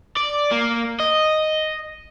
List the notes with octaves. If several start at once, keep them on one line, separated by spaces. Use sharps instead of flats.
D5
A#3
D#5